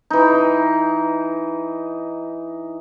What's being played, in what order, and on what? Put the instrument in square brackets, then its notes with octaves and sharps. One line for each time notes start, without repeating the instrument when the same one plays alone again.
[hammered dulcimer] E3 D#4